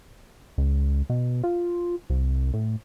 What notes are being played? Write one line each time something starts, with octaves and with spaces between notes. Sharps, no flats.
C#2
B2
F4
C2
A2